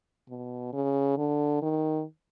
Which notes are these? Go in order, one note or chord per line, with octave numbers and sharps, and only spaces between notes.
B2
C#3
D3
D#3